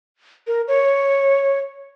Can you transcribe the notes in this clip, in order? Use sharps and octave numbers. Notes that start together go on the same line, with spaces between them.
A#4
C#5